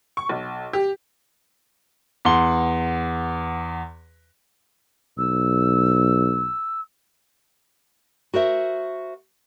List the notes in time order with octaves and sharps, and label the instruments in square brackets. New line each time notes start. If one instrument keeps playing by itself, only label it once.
[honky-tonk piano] C#6
B1
G4
[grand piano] E2 F#5 C6 G7
[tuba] B1 [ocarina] E6
[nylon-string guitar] F#4 A#4 C5 E5